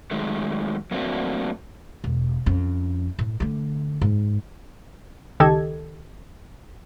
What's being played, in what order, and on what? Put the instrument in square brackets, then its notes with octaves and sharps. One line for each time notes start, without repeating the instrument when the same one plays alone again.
[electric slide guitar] D#3 F#3 G#3 A3
F#3 A3 A#3 C4 D4 F#4
[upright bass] E1
F2 C#4
A2
D3 A3
G#2
[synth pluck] C#2 D#3 G4 A4 D#5 G#6